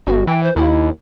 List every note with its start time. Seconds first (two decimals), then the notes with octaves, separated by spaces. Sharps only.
0.07 G1 F#4
0.27 E3 G5
0.43 C5
0.56 D#2 E4